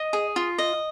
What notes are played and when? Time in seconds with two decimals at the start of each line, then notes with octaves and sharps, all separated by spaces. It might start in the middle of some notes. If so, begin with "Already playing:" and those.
Already playing: D#5
0.13 G#4
0.36 F4
0.58 D#5